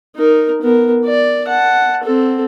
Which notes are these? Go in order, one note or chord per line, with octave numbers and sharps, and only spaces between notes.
D#4 A#4
B3 A#4
D5
F#5 A5
C4 A4